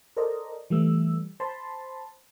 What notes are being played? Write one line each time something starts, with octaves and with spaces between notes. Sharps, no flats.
A4 A#4 C5 D5 D#5 A#5
E3 G3 A3 E6
C5 A5 B5 C6